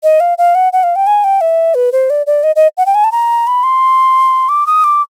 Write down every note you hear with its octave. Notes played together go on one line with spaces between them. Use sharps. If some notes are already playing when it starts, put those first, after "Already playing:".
D#5
F5
F5
F#5
F#5
F5
G5
G#5
G5
E5
B4
C5
D5
D5
D#5
D#5
F#5
G5
G#5
A5
A#5
B5
C6
D6
D#6
D6